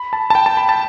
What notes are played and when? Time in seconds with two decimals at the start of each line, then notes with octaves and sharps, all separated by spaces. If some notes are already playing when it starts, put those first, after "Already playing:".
Already playing: B5
0.13 A5
0.30 A5
0.35 G5
0.46 A5
0.57 B5
0.69 A5